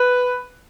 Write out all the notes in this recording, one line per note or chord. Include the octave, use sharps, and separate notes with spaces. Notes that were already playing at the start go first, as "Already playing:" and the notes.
Already playing: B4